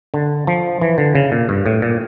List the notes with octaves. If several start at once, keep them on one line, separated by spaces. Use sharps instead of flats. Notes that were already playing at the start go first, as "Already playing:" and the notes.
D3
F3
E3
D3
C#3
A#2
G2
A2
A#2